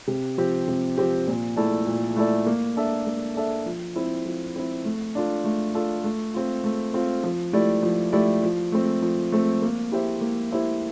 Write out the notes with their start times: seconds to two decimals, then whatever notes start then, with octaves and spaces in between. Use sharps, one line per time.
0.07 C3
0.38 F3 C4 G4
0.68 C3
0.98 F3 C4 G4
1.27 A#2
1.56 A3 E4 A4 D5
1.87 A#2
2.16 A3 E4 A4 D5
2.46 A#3
2.76 D4 A4 E5
3.07 A#3
3.36 D4 A4 E5
3.66 F3
3.96 C4 E4
4.25 F3
4.56 C4 E4
4.85 A3
5.15 D4 F4 A4
5.44 A3
5.75 D4 F4 A4
6.04 A3
6.34 C4 F4
6.64 A3
6.94 C4 F4
7.24 F3
7.53 A3 E4 G4 D5
7.83 F3
8.13 A3 E4 G4 D5
8.43 F3
8.72 A3 C4
9.02 F3
9.32 A3 C4
9.62 A#3
9.92 E4 G4 C5 E5
10.21 A#3
10.52 E4 G4 C5 E5